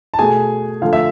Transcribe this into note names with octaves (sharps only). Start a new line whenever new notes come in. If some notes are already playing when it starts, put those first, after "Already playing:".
A5
B2 A3 G#4 G#5
D3 F3 A3 F5
E5